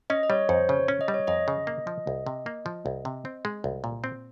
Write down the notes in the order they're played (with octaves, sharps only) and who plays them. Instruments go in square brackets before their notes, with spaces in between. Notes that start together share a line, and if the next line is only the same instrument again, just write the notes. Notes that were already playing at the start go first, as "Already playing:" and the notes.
[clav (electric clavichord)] C#4 [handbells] D#5
[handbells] D#5
[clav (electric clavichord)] G3 [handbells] C#5
[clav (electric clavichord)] F2 [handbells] C5
[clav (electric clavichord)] C#3 [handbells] C#5
[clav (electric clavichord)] C#4
[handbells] D#5
[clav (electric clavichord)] G3
[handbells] C#5
[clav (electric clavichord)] F2 [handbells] D#5
[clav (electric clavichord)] C#3
A#3
F3
C2
C3
A#3
F3
C2
C3
C4
G#3
C2
A#2
C4